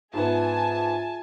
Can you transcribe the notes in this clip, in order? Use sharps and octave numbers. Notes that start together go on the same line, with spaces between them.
G#2 B3 F4 G#4 E5 G#5 A5